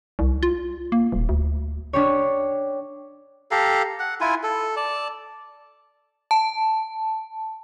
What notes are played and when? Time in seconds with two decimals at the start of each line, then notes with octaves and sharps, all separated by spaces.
0.19 C2
0.43 F4
0.92 A#3
1.12 D#1
1.29 D2
1.93 D4 G4 C#5
3.51 G4 A4 F5 A#5
4.00 F#5
4.21 E4 F4 G#5
4.43 A4
4.76 D5 A5
6.31 A5